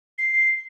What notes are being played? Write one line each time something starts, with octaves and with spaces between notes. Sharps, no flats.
C7